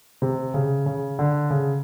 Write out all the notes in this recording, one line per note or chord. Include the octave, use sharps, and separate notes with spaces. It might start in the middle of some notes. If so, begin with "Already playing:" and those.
C3
C#3
C#3
D3
C#3